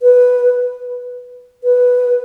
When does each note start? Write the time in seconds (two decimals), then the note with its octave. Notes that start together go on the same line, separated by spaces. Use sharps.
0.02 B4
1.64 B4